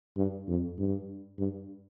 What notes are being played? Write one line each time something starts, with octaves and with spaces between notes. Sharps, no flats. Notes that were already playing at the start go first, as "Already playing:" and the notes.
G2
F2
G2
G2